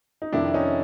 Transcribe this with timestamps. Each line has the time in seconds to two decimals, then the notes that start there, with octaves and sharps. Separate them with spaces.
0.22 D#4
0.33 F2 C3 D#3 D4 E4
0.54 C#4 D#4